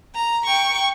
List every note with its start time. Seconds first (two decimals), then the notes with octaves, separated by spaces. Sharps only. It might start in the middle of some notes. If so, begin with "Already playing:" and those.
0.15 A#5
0.46 G5 C#6